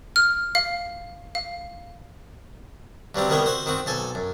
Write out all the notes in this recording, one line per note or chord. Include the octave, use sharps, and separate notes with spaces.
F6
F5
F5
G2 F#3 G3 C4
C2 D#3 G3 B3 C#5 G5
F#4 C5 E5
D#3 C4 F#4
B1 A4 G#5
F#2